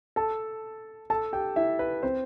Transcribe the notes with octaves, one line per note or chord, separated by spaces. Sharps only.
A4 A5
A4 A5
G4 G5
E4 E5
B4
C4 C5